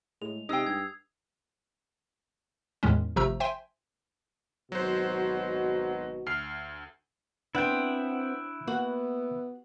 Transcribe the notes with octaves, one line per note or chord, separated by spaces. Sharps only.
A2 G#3 F7
C3 G#3 D#4 G5 D#6 E6 C7
G2 G#6
E2 A2 D#3 G#3 C#4
G#1 C3 F3 A3 A#5 E6
C5 E5 G5 G#5 C6
G#1 B2 F#3 F#4 C5
D2 F6 C7
B3 C4 D4 E4 F#5 G5
A#3 B3 F#4